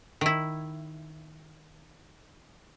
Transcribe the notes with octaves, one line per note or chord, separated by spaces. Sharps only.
D#3 E4